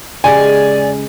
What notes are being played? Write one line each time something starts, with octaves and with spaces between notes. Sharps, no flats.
C#3 G#3 G4 D5 G#5